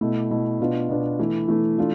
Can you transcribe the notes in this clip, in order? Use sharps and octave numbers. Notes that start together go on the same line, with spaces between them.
B2 A3 E4
B2 A3 E4
B2 B3 D4 F4
B2 B3 D4 F4
E3 A3 E4
E3 A3 E4
E3 A3 D4 F4